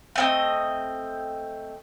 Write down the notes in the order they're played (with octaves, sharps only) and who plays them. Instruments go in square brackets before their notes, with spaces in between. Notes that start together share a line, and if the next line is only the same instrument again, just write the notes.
[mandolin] A3 C4 D#5